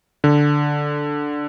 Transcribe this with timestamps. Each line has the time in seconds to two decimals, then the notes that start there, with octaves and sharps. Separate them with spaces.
0.24 D3